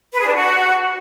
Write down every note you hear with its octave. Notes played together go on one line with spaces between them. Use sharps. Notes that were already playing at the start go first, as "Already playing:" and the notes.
B4
G#4
D4
F#4